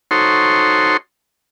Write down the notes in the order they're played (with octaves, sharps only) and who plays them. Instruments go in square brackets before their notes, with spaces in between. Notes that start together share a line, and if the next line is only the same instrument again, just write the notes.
[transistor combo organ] D#4 F#4 A4 C5 C#5 C6